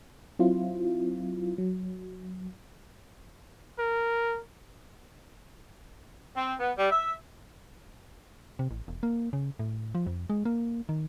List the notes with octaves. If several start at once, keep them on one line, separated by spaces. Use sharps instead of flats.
F#3 C4 E4 F4
F#3
A#4
C4
B3
G3
E5
C3
A1
E1
A#3
C#3
A2
F3
F2
G#3
A#3
D#3